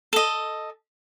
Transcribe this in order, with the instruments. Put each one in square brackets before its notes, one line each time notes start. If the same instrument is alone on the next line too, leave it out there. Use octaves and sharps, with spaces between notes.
[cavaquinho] A4 D#5